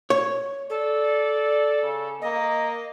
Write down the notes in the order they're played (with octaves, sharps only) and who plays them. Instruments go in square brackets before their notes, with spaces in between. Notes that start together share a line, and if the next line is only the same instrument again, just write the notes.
[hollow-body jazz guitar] C#5
[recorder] A4 [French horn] D5
[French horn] C#3
[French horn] A#3 [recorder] D#5